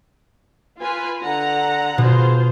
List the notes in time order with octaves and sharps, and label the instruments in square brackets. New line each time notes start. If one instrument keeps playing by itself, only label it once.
[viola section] F4 B4 G#5
D3 F#5 A#5
[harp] B2 [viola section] F4 G#4 C5